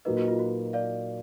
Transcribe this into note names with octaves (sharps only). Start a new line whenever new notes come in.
A#2 F#3 A#3 D#4 B4 D#5
F#4
F4
F#4
D5 F5